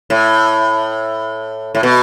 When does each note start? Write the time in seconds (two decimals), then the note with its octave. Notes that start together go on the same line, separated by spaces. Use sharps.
0.10 A2
1.75 A2
1.83 B2